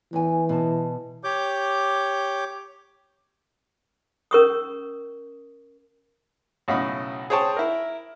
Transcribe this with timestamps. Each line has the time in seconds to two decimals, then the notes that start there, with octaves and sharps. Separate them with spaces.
0.13 E2 E3 G#5
0.49 B2 G#4 A5
1.24 G4 C#5 D6 G6
4.31 C#4 A#4 C#6 D#6
6.68 B1 A2 C#3 D#5 F5 B5
7.30 G#4 C5 C#5 G5 A5
7.57 E4 A#4